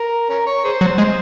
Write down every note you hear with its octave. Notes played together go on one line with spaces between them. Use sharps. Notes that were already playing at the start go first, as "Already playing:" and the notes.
Already playing: A#4
C#4 A#4
C#5
G#4 C5
F#3
G#3